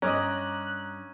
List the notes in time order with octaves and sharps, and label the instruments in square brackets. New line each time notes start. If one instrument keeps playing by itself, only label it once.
[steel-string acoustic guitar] G2 D#5 [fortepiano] C#4 [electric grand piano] A#5 D6 D#6 [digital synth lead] F#6